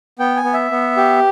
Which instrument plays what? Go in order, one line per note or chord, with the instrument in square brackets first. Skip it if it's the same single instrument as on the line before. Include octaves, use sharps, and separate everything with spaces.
[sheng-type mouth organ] B3 G5
G#5
B3
E5
B3
G4